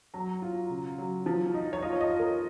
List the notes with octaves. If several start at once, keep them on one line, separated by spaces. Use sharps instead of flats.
F#3 A#5
F4
C#3
F#3
F3
D#4
C#5
F4 D#5
C#5
D#5
F4
A#4